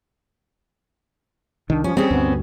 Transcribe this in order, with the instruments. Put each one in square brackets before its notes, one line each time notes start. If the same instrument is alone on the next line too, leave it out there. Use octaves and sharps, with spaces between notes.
[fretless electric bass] C2 D#3 [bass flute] D4
[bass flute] F3 [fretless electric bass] G3 [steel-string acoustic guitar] C#4
[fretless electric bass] G3 [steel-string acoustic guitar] C4 C#4 [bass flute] G#4
[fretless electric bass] D2 G2 [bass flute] B3